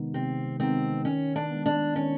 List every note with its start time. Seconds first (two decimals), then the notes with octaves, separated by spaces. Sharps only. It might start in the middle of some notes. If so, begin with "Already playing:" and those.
Already playing: C3 D#3 G#3 B3 D#4
0.13 C3 C4
0.60 D#3 G#3 B3 C4 D#4
1.05 D#3 C#4
1.36 D4
1.51 G#3 B3
1.66 D4
1.96 D#3 C#4